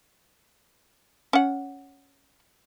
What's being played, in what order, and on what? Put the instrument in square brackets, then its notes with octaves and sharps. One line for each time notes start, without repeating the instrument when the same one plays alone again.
[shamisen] C#4 F#5